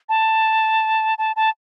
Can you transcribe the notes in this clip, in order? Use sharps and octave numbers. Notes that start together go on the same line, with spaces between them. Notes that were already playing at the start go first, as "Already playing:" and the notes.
A5
A5
A5